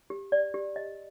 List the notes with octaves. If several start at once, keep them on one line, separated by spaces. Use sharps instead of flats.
G4
D5
G4
D#5